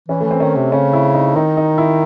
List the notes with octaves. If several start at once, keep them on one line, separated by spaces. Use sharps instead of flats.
E3 C#4
E3 A3
C4
D#3 C#4
C3
C#3 C#4
E4
D#4
D#3 D#4
D#4
E4